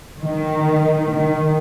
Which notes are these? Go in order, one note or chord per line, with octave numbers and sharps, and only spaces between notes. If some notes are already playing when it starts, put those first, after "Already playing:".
D#3
D#3